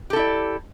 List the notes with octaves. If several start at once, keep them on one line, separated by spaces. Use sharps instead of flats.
E4 G4 A4 D5